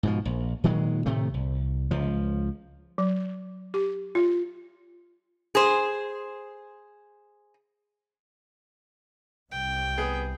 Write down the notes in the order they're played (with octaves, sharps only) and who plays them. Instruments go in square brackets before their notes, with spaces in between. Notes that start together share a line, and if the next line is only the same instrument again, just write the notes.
[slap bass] G#2 B2 F3
A#1
A#2 D#3 F#3 G#3
A2 C3 D#3 A3
C2
C#2 F3
[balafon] F#3
G4
F4
[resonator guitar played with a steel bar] G#4 C5
[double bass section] C2 [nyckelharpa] G5
[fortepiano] B3 G#4